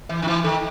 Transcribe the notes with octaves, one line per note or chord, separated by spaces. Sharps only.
E3 E5
D#3
E3 E4
D#3 A4